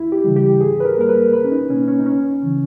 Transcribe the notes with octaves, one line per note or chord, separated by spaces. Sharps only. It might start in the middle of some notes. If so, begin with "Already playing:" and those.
Already playing: D#2 E4
G4
C#3 E3 G3
G4
G#2 G#4
B4
A#4
G3 A#3 A#4
B4
C#2 B4
C#4
D#4
B2 A#3 C#4
C#4
D#4
C#2 C#4
C#3 E3